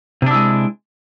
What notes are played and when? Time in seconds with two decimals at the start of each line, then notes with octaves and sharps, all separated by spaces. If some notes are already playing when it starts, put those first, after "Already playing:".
0.22 C3
0.26 D4
0.31 E4
0.35 G#3